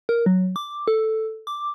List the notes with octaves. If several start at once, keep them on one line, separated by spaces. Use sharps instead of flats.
A#4
F#3
D6
A4
D6